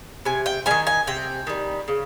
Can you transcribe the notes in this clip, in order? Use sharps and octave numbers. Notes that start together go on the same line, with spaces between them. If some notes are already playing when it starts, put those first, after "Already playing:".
C3 G#5
G5
D#3 G3 G#5
G#5
C3 G5
D#3 G3
C#3